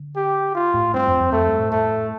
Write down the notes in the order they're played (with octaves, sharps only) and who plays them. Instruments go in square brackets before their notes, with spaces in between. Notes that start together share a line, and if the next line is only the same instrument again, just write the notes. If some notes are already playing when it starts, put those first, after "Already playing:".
Already playing: [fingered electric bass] D3
[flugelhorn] G4
F4
[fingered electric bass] A2
[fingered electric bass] G2 [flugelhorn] C4
[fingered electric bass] F2
F2
[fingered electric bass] F2 [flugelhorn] A3
[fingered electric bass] G2
A2
[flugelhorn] A3